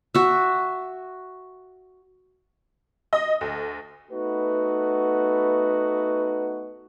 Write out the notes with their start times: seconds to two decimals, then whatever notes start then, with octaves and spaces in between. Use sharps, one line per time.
0.15 F#4 E5
3.13 D#5
3.41 D2
4.11 A3 B3 D#4 F#4 B4